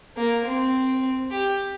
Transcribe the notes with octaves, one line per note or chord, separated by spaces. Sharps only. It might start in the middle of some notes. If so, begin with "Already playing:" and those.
A#3
C4
G4